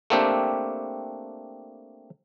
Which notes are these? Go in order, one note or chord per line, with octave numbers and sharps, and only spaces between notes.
A3 A#3 C4 D4 G4